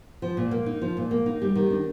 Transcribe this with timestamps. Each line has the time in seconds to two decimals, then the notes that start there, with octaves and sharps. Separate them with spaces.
0.22 F3
0.37 A#2
0.51 A#3
0.66 D#4
0.82 F3
0.97 A#2
1.11 A#3
1.26 D#4
1.42 G3
1.56 D#3
1.71 D4